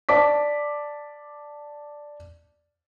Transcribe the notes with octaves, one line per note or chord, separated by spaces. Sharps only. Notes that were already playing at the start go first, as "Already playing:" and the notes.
D5 A5 D6 B6